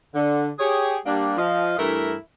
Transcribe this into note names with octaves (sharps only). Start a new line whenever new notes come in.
D3
G4 G#4 C#5
G3 A#3 D4
F3 D#5 F5
G2 E3 A3 E4 A#4